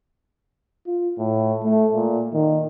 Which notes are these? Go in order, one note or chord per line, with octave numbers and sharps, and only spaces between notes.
F4
A2
A3
A#2
D#3